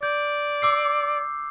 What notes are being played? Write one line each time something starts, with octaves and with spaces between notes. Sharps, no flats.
D5 G6
D6 E6 C7